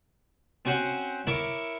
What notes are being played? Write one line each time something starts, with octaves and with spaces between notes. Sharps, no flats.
C4 C#4 F#4 C5 F#5
E4 A#4 C#5 E5 D6